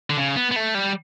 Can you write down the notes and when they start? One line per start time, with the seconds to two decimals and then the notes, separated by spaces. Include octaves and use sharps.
0.10 D3
0.17 C#3
0.36 B3
0.51 B3
0.56 A3
0.75 G3